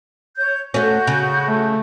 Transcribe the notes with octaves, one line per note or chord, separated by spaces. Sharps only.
C#5 G6
A3 C#4 F#4 G6
C#3
A3